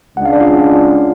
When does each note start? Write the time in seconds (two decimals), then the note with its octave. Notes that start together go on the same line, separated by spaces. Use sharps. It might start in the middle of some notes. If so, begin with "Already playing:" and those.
0.17 C#2 C#3 G#3 D4 F#5
0.26 F5
0.33 D5
0.40 F4 F5